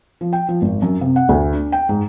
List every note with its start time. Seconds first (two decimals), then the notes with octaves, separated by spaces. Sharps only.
0.21 F3
0.33 G5
0.49 F3
0.62 G#1
0.82 F#2
1.01 C3
1.16 F#5
1.29 D2
1.53 D4
1.72 G5
1.89 G#2